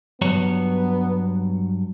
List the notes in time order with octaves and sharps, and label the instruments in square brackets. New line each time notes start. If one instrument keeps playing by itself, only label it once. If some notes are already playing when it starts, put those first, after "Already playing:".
[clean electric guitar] G2 F#3 C#5 [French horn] B3